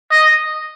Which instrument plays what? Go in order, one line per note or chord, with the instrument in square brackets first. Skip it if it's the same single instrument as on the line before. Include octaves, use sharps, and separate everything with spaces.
[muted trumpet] D#5